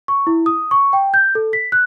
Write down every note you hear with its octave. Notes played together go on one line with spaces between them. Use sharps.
C#6
E4
D#6
C#6
G5
G6
A4
B6
F#6